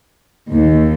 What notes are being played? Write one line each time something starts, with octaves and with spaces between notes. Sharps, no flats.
D#2